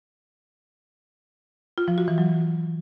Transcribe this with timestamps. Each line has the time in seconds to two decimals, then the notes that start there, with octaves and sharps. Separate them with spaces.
1.78 F4
1.88 F3
1.98 F#4
2.08 E3
2.18 F#3